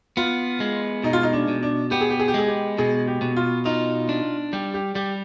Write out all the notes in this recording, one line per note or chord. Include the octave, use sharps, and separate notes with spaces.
B3 F4
G#3
B2 D#4
F4
D#4
D4
B2
D4
B3 G4
G#4
G4
G#4
G4
G#3 G#4
G4
B2 G#4
G4
B2
F4
D#4 F4
D4
G3 G4
G4
G3 G4